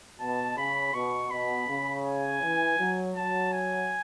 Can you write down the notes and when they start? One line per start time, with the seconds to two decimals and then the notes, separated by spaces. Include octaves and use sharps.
0.20 B2 A5
0.57 C#3 B5
0.94 B2 C#6
1.31 B2 B5
1.67 C#3
2.04 G#5
2.42 E3
2.79 F#3
3.16 F#3 A5
3.53 G#5